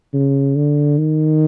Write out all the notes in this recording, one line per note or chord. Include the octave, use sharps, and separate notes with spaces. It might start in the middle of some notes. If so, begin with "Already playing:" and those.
C#3
D3
D#3